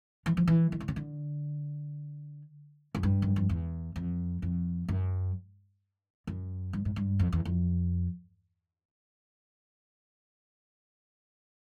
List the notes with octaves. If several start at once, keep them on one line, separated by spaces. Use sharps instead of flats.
E3
F3
E3
D#3
D3
C#3
D3
F#2
G2
F#2
F2
E2
F2
F2
F#2
F#2
G2
G#2
G2
F2
E2
F2